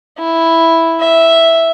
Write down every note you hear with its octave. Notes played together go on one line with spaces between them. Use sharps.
E4
E5